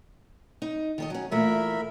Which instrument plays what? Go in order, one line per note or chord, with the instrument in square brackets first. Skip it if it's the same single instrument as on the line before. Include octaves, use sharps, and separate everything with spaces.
[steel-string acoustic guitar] D#4
D#3 A4 D#5
F#3 C#4
[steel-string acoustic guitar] A#2 E3 A3 [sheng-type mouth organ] A#4 E5 B5